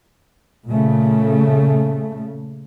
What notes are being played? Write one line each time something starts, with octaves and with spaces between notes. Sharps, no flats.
A#2 C#3 A3